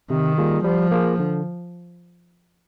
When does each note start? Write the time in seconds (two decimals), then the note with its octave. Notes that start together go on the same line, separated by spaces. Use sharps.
0.10 C3 D#3
0.38 G3 A#3 F4 G#4
0.64 F3 G3
0.92 A#3 F4 G#4
1.19 D3